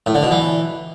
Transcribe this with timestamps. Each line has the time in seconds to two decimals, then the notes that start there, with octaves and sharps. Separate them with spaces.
0.06 A2
0.15 D3
0.23 B2
0.31 E3